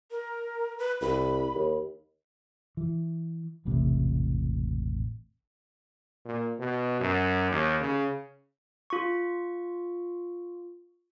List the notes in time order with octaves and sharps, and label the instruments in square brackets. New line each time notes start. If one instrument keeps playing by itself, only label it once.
[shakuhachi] A#4
B4
[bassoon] C2 [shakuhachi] B5
[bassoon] D#2
[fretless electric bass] E3
E1 A1 A2 C3
[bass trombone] A#2
B2
F#2
D#2
C#3
[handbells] F4 C#6